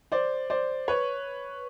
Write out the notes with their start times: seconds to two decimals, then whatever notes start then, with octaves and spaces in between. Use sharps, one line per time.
0.12 C5 D5
0.50 C5 D5
0.88 B4 C#5